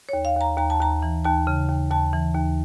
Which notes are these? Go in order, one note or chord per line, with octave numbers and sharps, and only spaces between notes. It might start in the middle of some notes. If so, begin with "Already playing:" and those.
D#2 C#5
F5
D#2 A#5
D#2 A#5
A5
D#2 A#5
E3
D#2 A5
C#3
D#2
D#2 A5
E3
D#2